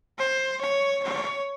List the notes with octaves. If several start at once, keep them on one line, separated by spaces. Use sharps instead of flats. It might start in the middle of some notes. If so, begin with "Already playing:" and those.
C5
C#5
C#5